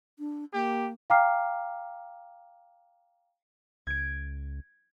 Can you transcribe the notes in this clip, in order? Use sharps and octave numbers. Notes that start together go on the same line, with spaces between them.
D4
A#3 G4
F5 G5 A#5 D6 F6 C7
C#2 G#6 D7